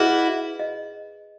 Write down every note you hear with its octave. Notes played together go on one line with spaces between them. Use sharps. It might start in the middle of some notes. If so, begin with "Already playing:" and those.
Already playing: E4 F#4 G#4 B4 D#5
D#5